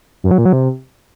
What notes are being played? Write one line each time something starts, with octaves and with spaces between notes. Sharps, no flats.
F#2
F#3
A#2
F#3
C3